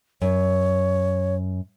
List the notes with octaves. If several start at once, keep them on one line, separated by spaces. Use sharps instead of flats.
F#2 C#5